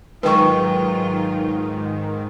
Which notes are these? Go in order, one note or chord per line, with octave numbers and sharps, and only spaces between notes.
G#2 D#3 F#3 F4 B4 G5 C#6